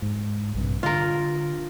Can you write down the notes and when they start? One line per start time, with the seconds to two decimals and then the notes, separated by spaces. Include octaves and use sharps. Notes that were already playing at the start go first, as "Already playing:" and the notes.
0.02 G#2
0.54 A#1 G2 C3
0.83 D3 F4 A#4